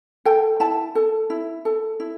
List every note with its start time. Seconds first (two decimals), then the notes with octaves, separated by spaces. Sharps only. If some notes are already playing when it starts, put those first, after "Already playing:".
0.25 A4 G5
0.60 E4 A5
0.95 A4
1.30 E4
1.65 A4
2.00 E4